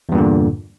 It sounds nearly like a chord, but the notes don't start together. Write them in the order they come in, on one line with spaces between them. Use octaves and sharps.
E2 G2 A#2 D3